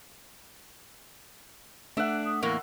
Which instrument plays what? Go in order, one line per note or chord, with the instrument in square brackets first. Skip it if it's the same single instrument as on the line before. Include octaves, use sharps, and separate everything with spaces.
[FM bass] A3 [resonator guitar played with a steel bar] D4 [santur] E5 F#5
[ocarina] D#6
[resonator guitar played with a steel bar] E2 A2 A#3 [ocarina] C#6